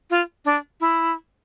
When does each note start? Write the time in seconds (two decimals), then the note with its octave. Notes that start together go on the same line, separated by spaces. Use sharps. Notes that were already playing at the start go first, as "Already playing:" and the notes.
0.10 F4
0.45 D4
0.81 E4